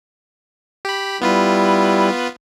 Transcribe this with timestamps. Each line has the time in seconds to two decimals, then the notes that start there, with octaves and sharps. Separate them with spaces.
0.85 G4 B5
1.22 G3 B3 E4 F4 B4